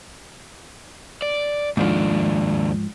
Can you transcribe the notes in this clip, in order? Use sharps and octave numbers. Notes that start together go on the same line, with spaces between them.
D5
D#2 G#2 F3 D4